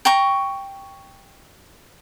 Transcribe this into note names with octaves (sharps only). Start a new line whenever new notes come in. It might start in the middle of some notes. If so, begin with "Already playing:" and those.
G5 A#5 C#6